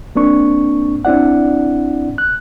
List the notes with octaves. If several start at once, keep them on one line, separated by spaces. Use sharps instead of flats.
A#3 C4 D4 C#6
C4 D4 E4 D5 F#5
F#6